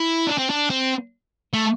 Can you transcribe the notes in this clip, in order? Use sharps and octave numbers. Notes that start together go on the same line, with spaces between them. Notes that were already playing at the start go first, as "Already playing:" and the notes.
Already playing: E4
D4
C4
D4
C4
A3